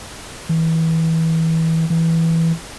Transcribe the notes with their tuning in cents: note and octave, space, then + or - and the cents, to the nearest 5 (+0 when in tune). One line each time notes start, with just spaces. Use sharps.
E3 -25
E3 -5